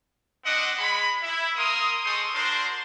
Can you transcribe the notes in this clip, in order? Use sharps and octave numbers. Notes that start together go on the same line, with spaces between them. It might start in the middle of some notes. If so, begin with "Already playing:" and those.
C4 D4 D#5 F#5
G#3 B5
E4
A#3 A#4 C6 D#6
G#3 A4 C5 C6 C#6 D#6
D4 F#4 A#4 C5 C6